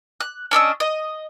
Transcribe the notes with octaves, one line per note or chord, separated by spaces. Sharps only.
F#6
C#4 D4 D#5 E6
D#5